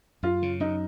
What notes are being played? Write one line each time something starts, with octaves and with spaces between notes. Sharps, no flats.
F#2 F4
C#3
F#2 D#4